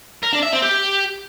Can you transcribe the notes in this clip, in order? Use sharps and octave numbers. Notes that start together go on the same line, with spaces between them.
A#4
D4
E5
C4
G4